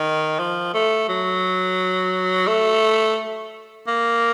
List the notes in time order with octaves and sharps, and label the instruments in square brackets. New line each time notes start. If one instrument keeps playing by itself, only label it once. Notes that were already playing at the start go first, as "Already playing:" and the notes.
Already playing: [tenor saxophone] D#3
F3
A3
F#3
A3
A#3